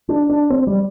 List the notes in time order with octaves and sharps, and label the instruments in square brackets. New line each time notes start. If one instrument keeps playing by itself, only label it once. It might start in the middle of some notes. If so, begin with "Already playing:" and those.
[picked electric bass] D4
D4
C4
G3